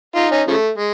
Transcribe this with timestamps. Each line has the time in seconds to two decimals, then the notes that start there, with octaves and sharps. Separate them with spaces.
0.15 D#4 F4
0.31 C#4 D#4
0.48 C#3 F3 A3
0.78 G#3